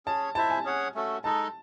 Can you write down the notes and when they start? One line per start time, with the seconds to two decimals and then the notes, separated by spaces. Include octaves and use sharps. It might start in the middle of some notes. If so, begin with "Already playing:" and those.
0.06 C#4 G#4 C#5 A5
0.35 E4 C5 E5 A5
0.50 G#5
0.65 C#4 G#4 C#5 F#5
0.95 A3 C#4 F#4 A4
1.24 G#3 D#4 A4 D#5 A5